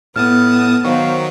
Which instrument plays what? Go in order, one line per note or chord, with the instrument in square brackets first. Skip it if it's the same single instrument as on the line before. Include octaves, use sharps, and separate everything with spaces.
[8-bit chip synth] A2 A5 D#6 [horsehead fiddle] B3 [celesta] F6
[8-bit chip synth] D#3 F#3 [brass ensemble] C5 F5 [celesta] C#6